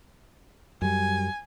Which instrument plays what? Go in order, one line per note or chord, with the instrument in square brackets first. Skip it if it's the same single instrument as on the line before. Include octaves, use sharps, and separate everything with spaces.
[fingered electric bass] F#2 G3 [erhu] G#5